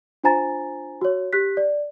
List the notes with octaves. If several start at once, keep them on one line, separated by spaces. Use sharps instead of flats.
D4 F4 C5 G#5 A#5 A6
F#4 C#5
G4 F#6 B6
D5